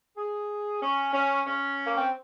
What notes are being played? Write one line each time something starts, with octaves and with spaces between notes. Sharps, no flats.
G#4
C#4
C#4
C#4
A#3
C4